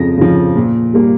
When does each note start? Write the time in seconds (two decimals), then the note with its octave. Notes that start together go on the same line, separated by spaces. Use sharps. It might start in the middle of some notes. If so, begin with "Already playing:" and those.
Already playing: F2 C#3 F3 A#6
0.18 C#3 F3
0.56 A#2
0.93 G3 A#3